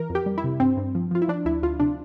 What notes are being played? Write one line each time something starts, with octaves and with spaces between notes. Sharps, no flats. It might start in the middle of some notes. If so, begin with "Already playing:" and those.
Already playing: E3 A#4
F2
G4
G3
E4
C3
G2 C4
G2
F3
F3 F4
E4
F3 D4
D2 E4
D2 F4
C3 D4